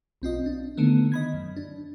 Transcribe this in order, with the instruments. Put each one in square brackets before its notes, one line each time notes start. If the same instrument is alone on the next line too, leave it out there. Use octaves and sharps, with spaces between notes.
[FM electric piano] B1 C4 F4 D#5
D4
D3 D#3 A3 B3
D#5 B5 G#6
F#2
D4